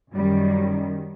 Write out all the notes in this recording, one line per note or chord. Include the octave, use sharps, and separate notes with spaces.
F#2 D#3 G3